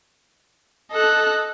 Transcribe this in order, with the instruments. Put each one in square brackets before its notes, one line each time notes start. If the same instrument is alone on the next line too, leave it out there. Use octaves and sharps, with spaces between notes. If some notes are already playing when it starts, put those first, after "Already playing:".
[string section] A4 [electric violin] D#5 F#6